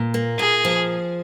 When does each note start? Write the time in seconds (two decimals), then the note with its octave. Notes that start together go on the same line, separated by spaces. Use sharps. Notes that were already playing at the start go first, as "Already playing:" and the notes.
Already playing: A#2
0.14 A#3
0.39 A#2 G#4
0.65 F3